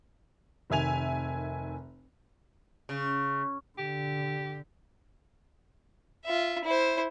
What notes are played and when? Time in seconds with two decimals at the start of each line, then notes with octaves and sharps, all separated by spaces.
0.70 F1 D#3 E5 G#5 F7
2.89 C#3
3.78 D3 G4
6.26 F4 E5
6.64 E4 C5